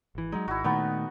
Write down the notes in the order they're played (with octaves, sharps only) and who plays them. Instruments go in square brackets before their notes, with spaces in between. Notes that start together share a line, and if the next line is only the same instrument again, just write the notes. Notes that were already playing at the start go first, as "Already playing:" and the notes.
[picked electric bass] G#1 E3
[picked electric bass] F#3 G#3 [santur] D#4
[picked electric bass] G#1 [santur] E4 F#4
[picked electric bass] A#2 D#3 A3 [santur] B3 D#4